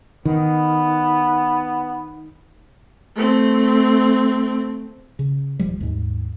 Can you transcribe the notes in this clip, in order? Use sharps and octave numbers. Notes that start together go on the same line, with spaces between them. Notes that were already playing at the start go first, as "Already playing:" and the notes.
D#3 B3
A3 C4
C#3
D#1 D#2 F3 G3
D#2 G#2